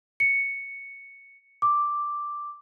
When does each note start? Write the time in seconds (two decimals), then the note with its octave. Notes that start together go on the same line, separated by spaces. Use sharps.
0.20 C#7
1.62 D6